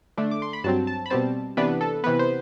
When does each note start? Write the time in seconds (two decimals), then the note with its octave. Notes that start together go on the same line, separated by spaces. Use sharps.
0.17 D3 A3 D4
0.31 D6
0.42 C6
0.53 B5
0.64 G2 F#3 C4 A5
0.87 A5
1.06 B5
1.10 B2 G3 C4 A5
1.57 C3 E3 B3 D4 B4
1.81 A4
2.04 C3 E3 B3 B4
2.19 C5